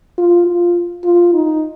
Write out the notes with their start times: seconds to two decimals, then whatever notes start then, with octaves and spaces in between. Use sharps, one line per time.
0.18 F4
0.46 F4
1.04 F4
1.34 D#4